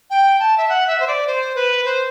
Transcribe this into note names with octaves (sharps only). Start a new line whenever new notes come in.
G5
A5
E5
F#5
E5
C5
D5
C5
B4
C5